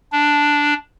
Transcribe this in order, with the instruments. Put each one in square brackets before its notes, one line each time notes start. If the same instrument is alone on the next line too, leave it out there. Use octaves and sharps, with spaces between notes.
[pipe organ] D4